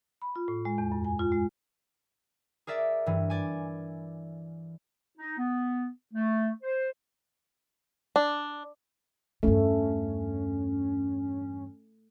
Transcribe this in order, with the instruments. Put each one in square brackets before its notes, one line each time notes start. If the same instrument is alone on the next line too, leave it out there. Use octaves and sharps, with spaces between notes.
[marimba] B5
F4
A2
G#3
E2
F#2
G#5
F4
G#3
[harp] G#4 A#4 D5 E5
G2 E3
D5 G#5
[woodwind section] D#4
B3
A3
C5
[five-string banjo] D4
[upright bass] E2 G2 [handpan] A3 [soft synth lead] C#4